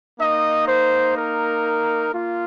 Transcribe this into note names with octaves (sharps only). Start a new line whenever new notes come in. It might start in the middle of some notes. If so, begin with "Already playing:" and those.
A#3 D#4 D#5
C5
A#4
A#3 F4